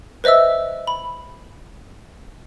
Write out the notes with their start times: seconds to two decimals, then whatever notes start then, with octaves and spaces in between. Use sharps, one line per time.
0.24 B4 C5 D#5 E5 E6
0.87 B5